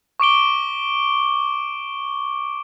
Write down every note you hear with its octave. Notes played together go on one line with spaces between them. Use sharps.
C#6 D6 D7 G7